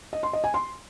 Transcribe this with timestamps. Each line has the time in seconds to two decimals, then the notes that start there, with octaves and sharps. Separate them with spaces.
0.13 D#5
0.23 C6
0.33 D#5
0.44 G#5
0.54 C6